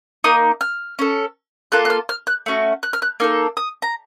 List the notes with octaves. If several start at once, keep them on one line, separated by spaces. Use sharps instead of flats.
A#3 D#4 D#6
F6
C#4 A4
A#3 F4 A4 F#6
F#6
F6
F6
F#6
A3 C#4 F#4
F#6
F6
F#6
A#3 D#4 A4 F6
D#6
A#5